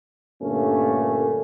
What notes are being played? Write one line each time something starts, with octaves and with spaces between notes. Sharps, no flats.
G2 A#2 D3 A3 A#3 C#4